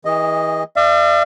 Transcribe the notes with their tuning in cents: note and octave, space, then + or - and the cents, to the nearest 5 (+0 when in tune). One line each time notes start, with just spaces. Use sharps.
E3 -30 G#4 -30 D#5 +0
D5 +35 F5 -45